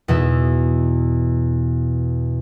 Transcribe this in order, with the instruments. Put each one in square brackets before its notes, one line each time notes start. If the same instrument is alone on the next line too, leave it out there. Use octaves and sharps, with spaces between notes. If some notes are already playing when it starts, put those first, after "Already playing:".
[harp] E2 B2 E5